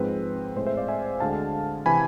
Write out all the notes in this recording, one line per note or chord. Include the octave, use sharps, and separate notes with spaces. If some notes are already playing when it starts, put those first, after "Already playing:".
Already playing: G#2 F3 G#3 C4 B4
A2 G#3 C4 C5
C5 E5
D5 F5
E5 G#5
D2 D3 G#3 F5 A5
C3 E3 G#5 B5